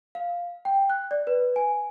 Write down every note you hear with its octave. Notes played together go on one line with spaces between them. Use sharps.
F5
G5
F#6
D5
B4
G#5